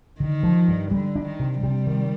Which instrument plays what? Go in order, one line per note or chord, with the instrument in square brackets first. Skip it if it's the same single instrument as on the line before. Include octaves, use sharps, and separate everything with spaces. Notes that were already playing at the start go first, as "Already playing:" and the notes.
[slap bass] D3 [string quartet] D#3
[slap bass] F3
G2
[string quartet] D3 [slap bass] G3
[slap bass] D4
[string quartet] D#3
[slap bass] C3
[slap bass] C3 [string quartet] G3
[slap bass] D#3